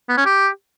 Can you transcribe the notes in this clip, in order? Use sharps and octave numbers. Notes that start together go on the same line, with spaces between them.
B3
C#4
G4